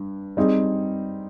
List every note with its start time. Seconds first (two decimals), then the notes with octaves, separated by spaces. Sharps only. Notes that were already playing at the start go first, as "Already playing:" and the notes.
Already playing: G2
0.37 G3 C4 D#4 G#4